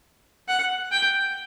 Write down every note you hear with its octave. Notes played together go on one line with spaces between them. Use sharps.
F#5
G5